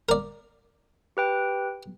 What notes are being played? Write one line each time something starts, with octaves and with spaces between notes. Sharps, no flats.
A#4 D5
G4 B4 G5